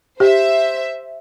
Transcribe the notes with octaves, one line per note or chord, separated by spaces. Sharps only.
G4 C5 E5